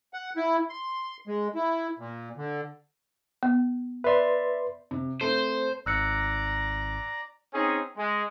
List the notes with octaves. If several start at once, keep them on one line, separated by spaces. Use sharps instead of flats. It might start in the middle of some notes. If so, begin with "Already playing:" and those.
F#5
E4
C6
G#3
E4
A#2
D3
B3
B4 D5 E5 C6
C3
A3 C4 C5
G#1 D5 A#5 E6 F#6 C#7
C4 C#4 D#4 G#4
G#3